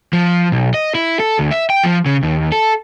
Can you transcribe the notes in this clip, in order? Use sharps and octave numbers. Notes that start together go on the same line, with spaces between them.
F3
B1
D#5
E4
A4
D2
E5
G5
F3
C#3
D#2
A4